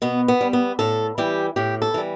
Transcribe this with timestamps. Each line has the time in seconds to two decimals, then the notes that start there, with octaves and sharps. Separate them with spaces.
0.02 B2 B3
0.28 B3
0.41 G3
0.53 B3
0.79 A2 A4
1.18 E3 G3 G4
1.56 A2 G4
1.82 A4
1.94 E3 G3